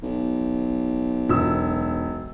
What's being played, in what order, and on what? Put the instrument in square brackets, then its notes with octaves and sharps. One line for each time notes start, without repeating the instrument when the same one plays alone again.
[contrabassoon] B1
[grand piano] E1 E6